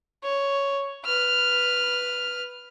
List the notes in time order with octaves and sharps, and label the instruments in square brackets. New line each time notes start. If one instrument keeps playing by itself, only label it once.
[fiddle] C#5
B4 F6